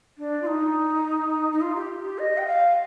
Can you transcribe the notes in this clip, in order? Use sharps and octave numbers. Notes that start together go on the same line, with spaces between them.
D4
F4
D#4
D#4
F4
G4
G4
D#5
G5
F5